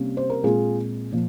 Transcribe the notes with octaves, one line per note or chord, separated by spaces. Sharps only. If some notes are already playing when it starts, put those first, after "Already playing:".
Already playing: C3 G3 A#3 C#4
C5
A#4
A#2 G#3 C4 F4 G#4
A#2 F3